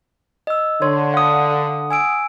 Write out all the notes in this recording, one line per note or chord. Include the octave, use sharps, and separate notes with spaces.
D#5 E6
D3 C#5 C6
F5 F#5 D#6
G#5 E6 D7